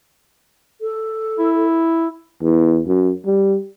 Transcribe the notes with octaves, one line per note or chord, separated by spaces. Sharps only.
A4
E4
E2
F#2
G3